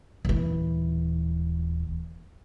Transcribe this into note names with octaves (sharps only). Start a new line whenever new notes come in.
D#1 E3